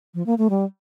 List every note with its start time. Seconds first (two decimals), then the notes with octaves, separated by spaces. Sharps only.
0.14 F3
0.26 A#3
0.38 A3
0.50 G3